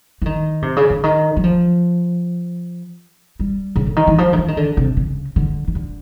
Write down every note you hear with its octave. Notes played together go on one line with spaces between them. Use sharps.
E3
D#3
C3
C#3
D3
D#3
F#3
F3
G3
C#3
D3
D#3
E3
F3
D#3
E3
D#3
D3
C3
C#3
D3
D#3
D3